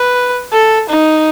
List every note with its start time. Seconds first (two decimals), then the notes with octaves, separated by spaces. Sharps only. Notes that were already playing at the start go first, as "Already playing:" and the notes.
Already playing: B4
0.53 A4
0.90 D#4